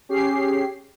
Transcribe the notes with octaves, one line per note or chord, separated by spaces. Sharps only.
C#4 G4 G#4 C7